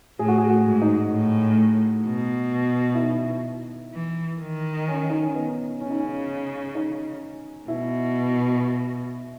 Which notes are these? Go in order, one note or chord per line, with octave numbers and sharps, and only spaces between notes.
A2 G#4
F#4
G#4
F#4
G#2
D#4
A2
B2
E4
D#4
E3
D#3
C#4
D#4
C#4
B3
C#3 C#4
D#4
C#4
D#4
B2 E4